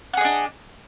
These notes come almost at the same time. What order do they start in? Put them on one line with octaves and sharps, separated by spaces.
F#5 G#4 D#5 D4